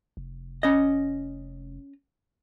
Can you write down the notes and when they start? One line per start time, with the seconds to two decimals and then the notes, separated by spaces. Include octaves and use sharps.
0.17 F1
0.63 C#4 D#5